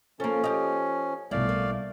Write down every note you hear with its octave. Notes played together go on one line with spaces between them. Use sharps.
F3 A#3 C#4 A4
G4 D#5
B1 G3 A3 E4 D5 F5
A#3